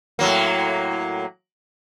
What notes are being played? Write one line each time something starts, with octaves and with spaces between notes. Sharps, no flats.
A2 F#3 A#3